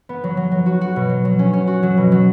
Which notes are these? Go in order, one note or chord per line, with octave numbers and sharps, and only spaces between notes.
B3
F#3
F#3
F#3
F#4
F#4
B2
F#3
F#3
C#4
C#4
F#4
F#3
B2
F#3